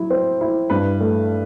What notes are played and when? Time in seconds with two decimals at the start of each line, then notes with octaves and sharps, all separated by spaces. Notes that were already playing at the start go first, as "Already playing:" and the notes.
Already playing: F#3 E4
0.10 C4
0.41 E4
0.70 G2 B4
1.01 A3